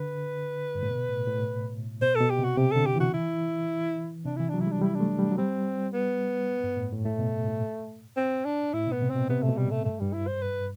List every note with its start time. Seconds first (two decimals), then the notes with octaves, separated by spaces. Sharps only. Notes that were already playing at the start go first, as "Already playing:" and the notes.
Already playing: D3 B4
0.75 G2
0.83 A2
0.89 B2
1.09 A2
1.27 A2
2.02 B2 C5
2.15 A4
2.21 B2
2.30 G4
2.39 C3
2.44 F#4
2.57 C3 G4
2.72 D3 A4
2.86 G4
2.95 E3 F#4
3.14 E4
4.25 C3 D4
4.37 E3 E4
4.49 F#3 D4
4.61 E4
4.67 G3 D4
4.81 G3 E4
4.95 D4
5.00 A3
5.19 G3
5.32 F#3
5.37 G3 C4
5.93 B3
6.64 G2
6.77 A2
6.92 A2
7.05 A2 A3
7.19 B2
7.48 A2
8.17 C4
8.45 D4
8.74 A2 E4
8.88 B2 B3
9.02 C3
9.10 C4
9.15 B2
9.29 C3 B3
9.43 A3
9.49 B2
9.57 G3
9.67 A2 A3
9.85 G2 A3
10.00 G2 G3
10.13 E4
10.27 C5
10.42 B4